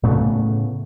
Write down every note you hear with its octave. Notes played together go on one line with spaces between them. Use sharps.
A2 C#3 A3 B3